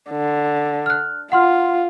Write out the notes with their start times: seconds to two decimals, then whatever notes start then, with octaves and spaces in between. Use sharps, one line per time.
0.10 D3
0.86 F6 F#6
1.32 F4 F#5 C6 F6